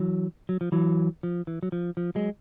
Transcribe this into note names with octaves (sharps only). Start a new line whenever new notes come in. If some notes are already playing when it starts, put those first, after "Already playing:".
Already playing: E3 F#3
F#3
F3
E3 F#3
F3
E3
F#3
F3
F3
F#3 G#3